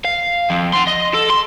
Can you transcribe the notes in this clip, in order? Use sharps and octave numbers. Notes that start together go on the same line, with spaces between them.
F5
F2
F#5 C6
D#5
A4
C6